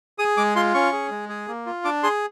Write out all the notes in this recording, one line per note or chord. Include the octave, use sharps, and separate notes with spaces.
G#4 D#6
G#3 D6
F4 C6
C#4 C#6
G#4
G#3
G#4
A#3
F4
D4 D6
G#4 C6